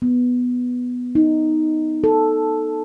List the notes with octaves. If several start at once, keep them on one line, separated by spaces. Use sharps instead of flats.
B3
D#4
A4